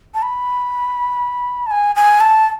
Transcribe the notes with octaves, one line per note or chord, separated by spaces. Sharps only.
A5
B5
A5
G#5
G#5
A5